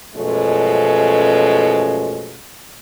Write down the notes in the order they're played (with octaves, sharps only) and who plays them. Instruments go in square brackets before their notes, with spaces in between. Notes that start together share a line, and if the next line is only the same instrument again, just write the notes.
[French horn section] F#2 B2 F3 G#3 A3 C#4